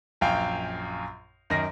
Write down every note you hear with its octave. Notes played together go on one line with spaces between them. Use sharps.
A#1 F#2 F5 G5 G#5
F#2 D#3 A#6